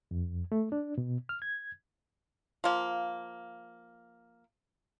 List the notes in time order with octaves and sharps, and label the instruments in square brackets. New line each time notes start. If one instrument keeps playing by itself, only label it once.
[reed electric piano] F2
A3
D4
B2
F6
G#6
[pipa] F3 A#3